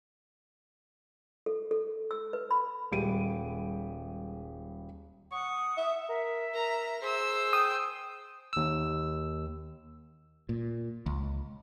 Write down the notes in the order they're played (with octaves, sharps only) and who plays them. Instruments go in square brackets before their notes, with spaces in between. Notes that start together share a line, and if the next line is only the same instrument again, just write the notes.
[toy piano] A4
A4
E6
B4
B5
[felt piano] D#1 G3 G#3 D7 D#7
[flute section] F#5 D#6 [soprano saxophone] C#6
[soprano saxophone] E5
[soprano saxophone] A#4 [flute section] E5
[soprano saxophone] A#4 [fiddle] A#5
[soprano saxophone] G#4 [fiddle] C5 E6
[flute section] G5 G6 [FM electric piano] D#6
[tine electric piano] D#2 E6
[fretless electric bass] A#2
C#2